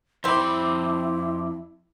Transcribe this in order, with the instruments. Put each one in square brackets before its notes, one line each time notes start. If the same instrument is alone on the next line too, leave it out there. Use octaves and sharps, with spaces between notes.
[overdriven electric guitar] F2 B5 [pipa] G3 C4 [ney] E4 [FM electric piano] C6 D6